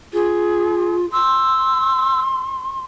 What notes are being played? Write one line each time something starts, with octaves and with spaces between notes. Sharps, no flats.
F4 G#4
C6 E6